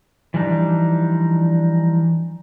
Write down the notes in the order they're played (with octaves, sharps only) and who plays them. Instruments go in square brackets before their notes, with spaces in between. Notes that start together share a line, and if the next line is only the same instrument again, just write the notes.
[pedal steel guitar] E3 F3 G3 D4 D#4